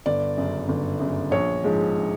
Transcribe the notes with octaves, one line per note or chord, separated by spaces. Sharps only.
G1 D5
F#2 C#3
G1
F#2 C#3
A#1 C#5
G#2 F3 G#3